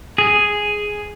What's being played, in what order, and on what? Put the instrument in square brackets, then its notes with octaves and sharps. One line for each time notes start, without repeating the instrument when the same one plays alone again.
[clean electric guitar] G#4